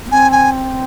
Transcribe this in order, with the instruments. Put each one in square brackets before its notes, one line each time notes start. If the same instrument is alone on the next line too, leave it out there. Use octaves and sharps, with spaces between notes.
[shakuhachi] A#3
[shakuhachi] C4 [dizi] G#5
[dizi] G#5